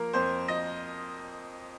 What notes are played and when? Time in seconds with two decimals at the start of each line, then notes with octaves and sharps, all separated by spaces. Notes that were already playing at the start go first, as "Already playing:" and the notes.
Already playing: F3 A#3 A#4
0.13 F2 C5
0.48 F3 D#5